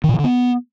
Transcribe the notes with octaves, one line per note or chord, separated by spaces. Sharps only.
D#3
A#2
D#3
D3
B3